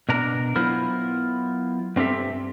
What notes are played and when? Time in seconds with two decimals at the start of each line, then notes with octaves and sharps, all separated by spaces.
0.09 B2 D4 A#4 A#5
0.56 F#3 B3 E4 F4 A#4 C5
1.96 G2 C4 G4 A4 E5